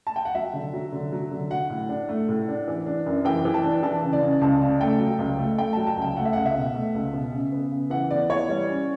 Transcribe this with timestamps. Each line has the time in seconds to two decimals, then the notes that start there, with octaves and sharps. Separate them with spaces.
0.07 A5
0.16 G5
0.25 F#5
0.35 F#3 E5
0.53 D3
0.73 F#3
0.92 D3
1.12 F#3
1.31 D3
1.51 F#3 F#5
1.70 A2
1.89 D4
2.09 A3
2.28 A2
2.48 D4
2.68 E3
2.86 D4
3.06 F#2
3.25 E3 G5
3.45 E3
3.54 A5
3.64 D4
3.83 E3 A5
4.02 C#3
4.13 D5
4.22 C#3
4.41 C#2 A5
4.61 C#3 A5
4.81 A3 G5
5.00 F#3
5.19 C#2
5.39 A3
5.58 A3 G5
5.73 F#3 A5
5.87 A5
5.97 C#2 G5
6.16 A3 F#5
6.25 E5
6.33 C#2 F#5
6.45 E5
6.55 B2
6.74 A3
6.94 C#2
7.14 B2
7.32 C#3
7.52 B3
7.72 C#3
7.90 E3 F#5
8.11 B3 D5
8.29 E3 C#5
8.48 G3
8.68 C#4